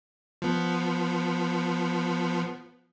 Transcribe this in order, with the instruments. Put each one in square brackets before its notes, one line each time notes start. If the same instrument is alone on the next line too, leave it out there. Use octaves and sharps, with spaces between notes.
[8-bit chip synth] F3 B3